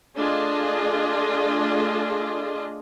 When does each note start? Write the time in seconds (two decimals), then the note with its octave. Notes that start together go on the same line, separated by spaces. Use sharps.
0.16 A3 D4 F4 G#4 D#5